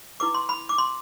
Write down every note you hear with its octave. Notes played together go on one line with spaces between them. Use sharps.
E4 B4 D6
C6
B5
D6
C6